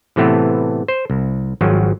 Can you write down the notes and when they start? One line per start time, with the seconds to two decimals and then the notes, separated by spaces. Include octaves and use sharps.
0.16 A2 C3 E3 A3 B3
0.88 C5
1.10 C2
1.61 G#1 F3 F#3